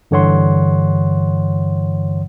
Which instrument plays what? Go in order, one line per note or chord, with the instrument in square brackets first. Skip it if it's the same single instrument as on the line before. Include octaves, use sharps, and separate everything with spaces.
[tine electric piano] G2 D3 E3 C#5 F#5 C6